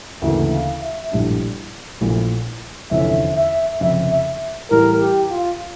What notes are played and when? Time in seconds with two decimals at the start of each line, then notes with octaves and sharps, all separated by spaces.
0.21 D2 C#3 E3 A#3 E5
0.51 F5
0.82 E5
1.12 A#1 A2 G3 D4
2.01 A#1 A#2 A3 E4
2.91 F1 E2 D3 F3 C#4 E5
3.36 E5
3.80 F1 F2 C#3 E5
4.11 E5
4.71 A2 E3 G3 A#4
5.00 G4
5.30 F4